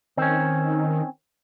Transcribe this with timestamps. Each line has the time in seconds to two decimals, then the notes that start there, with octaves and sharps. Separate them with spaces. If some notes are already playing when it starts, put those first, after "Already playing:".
0.17 D#3 C4 C#4